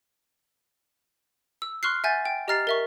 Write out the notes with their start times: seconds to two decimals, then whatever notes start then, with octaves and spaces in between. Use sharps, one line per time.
1.62 E6
1.83 C6 C#6 F6 F#6 C7
2.04 E5 F#5 G#5 G6 A6
2.25 G5
2.48 G4 D#5 A#5 F6 A6 C7
2.67 A#4 E5 C#6